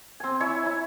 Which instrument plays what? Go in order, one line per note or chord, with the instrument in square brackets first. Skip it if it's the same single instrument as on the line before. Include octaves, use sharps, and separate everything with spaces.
[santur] C4 G#5
E4 C#5 E5 G#5
E4